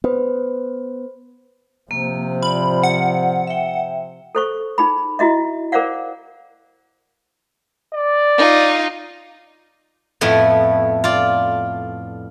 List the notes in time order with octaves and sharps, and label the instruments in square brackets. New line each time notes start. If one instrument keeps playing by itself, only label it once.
[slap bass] B3 [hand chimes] B4 C5
[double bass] C3 F3 [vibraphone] A#3
[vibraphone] F4 D5 [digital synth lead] B5
[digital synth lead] F#5
[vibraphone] E5 G5
[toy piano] A4 C5 C#6
D#4 G#4 B5
E4 F#4 D#5 E5
G#4 A#4 C5 D5 F5 F#5
[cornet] D5
[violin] D#4 F4
[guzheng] F2 A2 A3 B3 E4
F4 D5